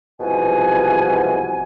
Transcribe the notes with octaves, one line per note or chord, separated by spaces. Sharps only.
C2 G#2 B2 E3 F3 G#5